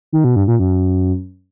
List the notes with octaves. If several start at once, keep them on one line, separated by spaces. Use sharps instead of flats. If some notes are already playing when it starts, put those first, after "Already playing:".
D#3
B2
G2
A#2
F#2